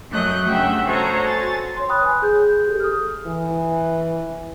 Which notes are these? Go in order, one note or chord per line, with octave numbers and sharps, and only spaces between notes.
F#2 F#3 A3 D#5 F#6 G6
G2 C#3 A3 E5 F#5 G5
F#4 A4 C5 C#5 D#5 A#5
G#5 A6
C#5 C6
G5 B5 D#6 F#6
B4 G#5
G#4 G6
G4 A4
D#6 F6
E3